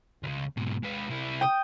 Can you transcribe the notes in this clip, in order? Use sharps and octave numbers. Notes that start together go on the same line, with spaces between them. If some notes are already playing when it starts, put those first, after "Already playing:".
C#2 C#3
G#2 B2
G#3 B4
C3 E4
G5 D#6